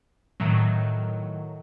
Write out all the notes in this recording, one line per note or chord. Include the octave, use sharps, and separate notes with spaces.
A2 D#3 F#3